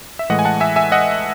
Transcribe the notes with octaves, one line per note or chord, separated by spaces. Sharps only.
E5
A2 E3 G#3 D#5 F#5
G#5
F#5 A5
E5 G#5
E5 G#5
D#5 F#5